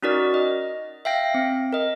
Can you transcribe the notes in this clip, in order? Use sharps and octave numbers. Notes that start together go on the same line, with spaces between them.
C#4 D#4 F#4 A#4 D5
D#5
E5 F5 G5 A#6
C4
A#4 D#5